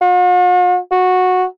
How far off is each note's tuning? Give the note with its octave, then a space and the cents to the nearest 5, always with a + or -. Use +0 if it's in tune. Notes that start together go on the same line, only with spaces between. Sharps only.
F#4 -45
F#4 -15